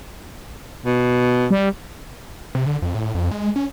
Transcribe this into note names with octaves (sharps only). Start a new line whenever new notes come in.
B2
G3
C3
D3
F2
A2
F2
G#3
C#4